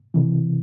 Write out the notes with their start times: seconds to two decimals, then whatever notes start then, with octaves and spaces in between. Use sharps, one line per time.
0.14 C3 E3